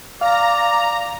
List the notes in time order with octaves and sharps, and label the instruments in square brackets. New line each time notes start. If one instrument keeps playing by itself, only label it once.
[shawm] D5 [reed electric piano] F5 [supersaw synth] A#5